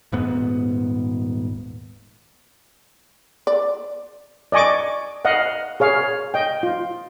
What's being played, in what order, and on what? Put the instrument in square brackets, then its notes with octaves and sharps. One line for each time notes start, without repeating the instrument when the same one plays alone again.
[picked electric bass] D#1 G#2 B3
[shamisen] D5
[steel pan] D5 D#5 G#5 C#6 D6
D#5 F5 F#5
G#4 C#5 F5
D#5 G5
F4